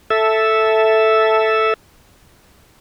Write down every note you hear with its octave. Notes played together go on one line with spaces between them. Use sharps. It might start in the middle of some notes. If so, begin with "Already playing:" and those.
A4 E5